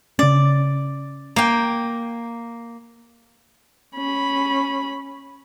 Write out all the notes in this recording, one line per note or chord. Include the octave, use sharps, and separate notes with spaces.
C#3 C#4 D5
A#3 G5
C#4 B5